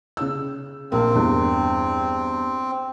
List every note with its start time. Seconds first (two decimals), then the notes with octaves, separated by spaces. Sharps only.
0.17 C#3 E6
0.92 A#1 A#3 C4
1.15 E2 G2